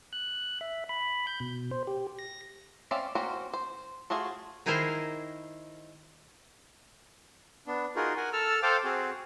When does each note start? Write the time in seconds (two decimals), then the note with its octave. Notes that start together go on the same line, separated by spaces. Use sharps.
0.13 F#6
0.61 E5
0.89 B5
1.27 G6
1.40 B2
1.71 C5
1.87 G4
2.19 A#6
2.91 C4 C#4 D5 E5 F5
3.15 A#3 C4 C#4 F#4 C5
3.53 C5
4.10 A3 F4 F#4 G#4
4.66 D#3 D#4 E4 G#4 A#4 C5
7.67 B3 D4
7.96 D#4 F4 F#4 G#4 A#4
8.16 A#4 F#5 G#5
8.33 A4 A5 E6 F6
8.63 A4 C5 F5 G5 A5 D6
8.84 C4 F#4 G#4